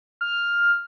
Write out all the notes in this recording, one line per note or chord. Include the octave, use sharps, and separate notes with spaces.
F6